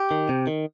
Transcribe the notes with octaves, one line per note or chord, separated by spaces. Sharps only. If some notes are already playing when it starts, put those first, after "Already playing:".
Already playing: G4
D#3
C3
D#3